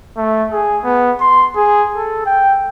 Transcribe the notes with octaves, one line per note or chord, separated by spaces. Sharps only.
A3
G#4
B3
C6
G#4
A4
G5